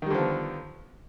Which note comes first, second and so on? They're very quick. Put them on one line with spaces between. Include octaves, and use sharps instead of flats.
D#3 G3 D3 F3 B3